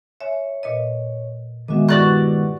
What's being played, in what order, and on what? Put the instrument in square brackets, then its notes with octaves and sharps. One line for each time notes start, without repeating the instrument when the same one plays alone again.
[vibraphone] C#5 [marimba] E5 G#5
[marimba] A#2 B4 D#5
[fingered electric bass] D#3 G#3 B3 [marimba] F#4 D#5 [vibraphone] E5 G#5 D6
[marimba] G2 [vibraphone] E4 G4 B4 [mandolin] F#4 D5 F#6